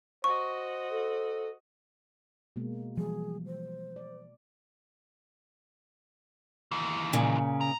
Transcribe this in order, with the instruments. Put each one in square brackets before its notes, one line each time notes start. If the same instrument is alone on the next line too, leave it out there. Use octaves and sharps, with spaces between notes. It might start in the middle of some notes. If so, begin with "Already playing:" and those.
[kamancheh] F#4 D#5 [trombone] C5 [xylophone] C#6
[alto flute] A4
[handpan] B2 G#3 A#3
[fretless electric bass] E3 F3 G3 [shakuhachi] G#4
[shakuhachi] C5
[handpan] D5
[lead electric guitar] D#2 E3
[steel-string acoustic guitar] A#2 C#3
[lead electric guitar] A#5